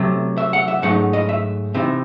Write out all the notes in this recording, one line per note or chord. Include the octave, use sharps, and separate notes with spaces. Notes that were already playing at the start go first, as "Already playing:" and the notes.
Already playing: C3 F#3 A3
E5
F#5
E5
G#2 F#3 A3 D#4 F#5
D#5
E5
C3 E3 C4 D#4 E5